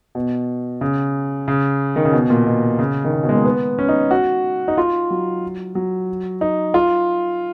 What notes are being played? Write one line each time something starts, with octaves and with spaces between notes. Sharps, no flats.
B2
C#3
C#3
D#3
C#3
B2
A#2
B2
C#3
D#3
C#3
B2
G#3
A#3
B3
C#4
D#4
F#4
D#4
F4
F#3
F#3
D#4
F4